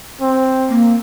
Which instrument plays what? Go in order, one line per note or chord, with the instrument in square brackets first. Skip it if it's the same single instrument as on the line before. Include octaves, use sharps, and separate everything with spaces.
[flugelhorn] C4
[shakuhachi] A#3